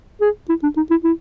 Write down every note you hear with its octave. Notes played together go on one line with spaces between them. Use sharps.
G#4
E4
D4
D#4
E4
E4